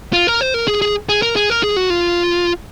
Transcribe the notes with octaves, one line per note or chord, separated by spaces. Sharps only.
F4
A#4
C5
A#4
G#4
G#4
G#4
A#4
G#4
A#4
G#4
F#4
F4